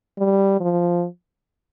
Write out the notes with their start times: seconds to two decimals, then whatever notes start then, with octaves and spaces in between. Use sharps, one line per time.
0.18 G3
0.60 F3